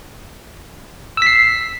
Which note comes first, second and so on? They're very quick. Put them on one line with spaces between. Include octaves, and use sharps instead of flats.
E6 B6 C7